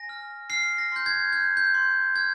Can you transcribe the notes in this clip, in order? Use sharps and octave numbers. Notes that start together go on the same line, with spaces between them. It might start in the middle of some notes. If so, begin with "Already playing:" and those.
Already playing: G#5 A#6
F6
F6 C7
A#6
C6 G6
G#6
F6 G6
G6
C6
F6 G#6